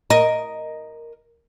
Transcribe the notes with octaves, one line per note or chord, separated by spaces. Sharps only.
A#4 D#5